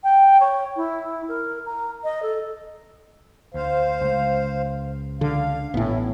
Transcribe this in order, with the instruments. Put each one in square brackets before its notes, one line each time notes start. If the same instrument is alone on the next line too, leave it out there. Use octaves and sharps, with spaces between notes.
[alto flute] G5
C#5
E4
A#4
A#5
D#5
A4
[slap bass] D2 [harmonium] C5 F5
[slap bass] C#2
[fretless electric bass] D3 [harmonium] F5
[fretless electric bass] A1 A2 [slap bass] B3 [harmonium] C#4 E4